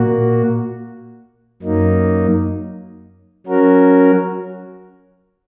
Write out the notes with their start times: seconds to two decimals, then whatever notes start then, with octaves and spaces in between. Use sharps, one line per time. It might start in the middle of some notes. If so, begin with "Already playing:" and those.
Already playing: A#2 A#3 F#4
1.62 F#2 F#3 A#3 D#4
3.47 F#3 C#4 F#4 A#4